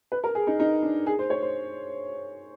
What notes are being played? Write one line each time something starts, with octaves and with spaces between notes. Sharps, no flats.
B4
A#4
G#4
D#4
D#4
D4
G#4
C5
C#5
C5